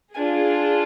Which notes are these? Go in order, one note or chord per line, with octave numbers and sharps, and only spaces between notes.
D4 F4 G#4 G#5